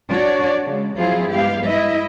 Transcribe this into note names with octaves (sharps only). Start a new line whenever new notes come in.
D4 F#4 C#5 D5
C#3 G#3
F3 F#3 C4 E4 F4 G#4
G2 G#3 B3 G4 F5
E4 D#5 E5